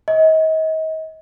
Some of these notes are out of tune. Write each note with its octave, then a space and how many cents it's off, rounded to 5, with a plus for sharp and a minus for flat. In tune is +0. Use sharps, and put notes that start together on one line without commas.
D#5 +35